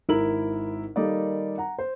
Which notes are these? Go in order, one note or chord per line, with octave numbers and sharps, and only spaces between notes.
G#1 E4 A#4 F#7
D#3 G3 A#3 D#4 A4 D5
F#5 A#5
C5